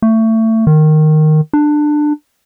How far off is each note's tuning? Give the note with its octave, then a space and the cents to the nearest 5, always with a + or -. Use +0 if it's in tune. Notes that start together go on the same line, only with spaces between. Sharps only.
A3 +25
D#3 -10
D4 +20